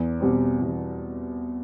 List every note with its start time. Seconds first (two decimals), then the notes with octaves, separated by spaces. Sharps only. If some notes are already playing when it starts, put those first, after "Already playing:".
Already playing: E2
0.20 B2 G3 C4
0.61 E2